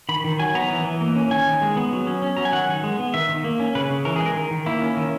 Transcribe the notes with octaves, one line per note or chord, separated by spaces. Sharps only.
D#3 B5
D#3
F#3 G#5
B3 A#5
E3
E3
A#3
C#4
D#3 G#5
D#3
G#3
B3
F#3
C#4
C#4
F#3 A#5
G#5
D#3 F#5
D#3
G#3
B3
D#3 E5
D#3
A#3
C#4
C#3 B4
C#3
E3 A#4
G#4
G#3
A#4
D#3
D#3
A#3 E4
C#4
D#3